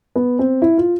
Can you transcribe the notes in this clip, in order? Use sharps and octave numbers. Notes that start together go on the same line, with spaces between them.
B3
C4
E4
F4